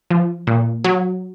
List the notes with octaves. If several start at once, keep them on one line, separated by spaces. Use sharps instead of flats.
F3
A#2
F#3